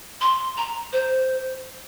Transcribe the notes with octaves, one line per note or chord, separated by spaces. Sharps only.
C6
A#5
C5